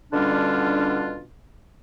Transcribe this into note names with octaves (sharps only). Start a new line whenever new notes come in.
B2 D3 G3 C#4 D4 F4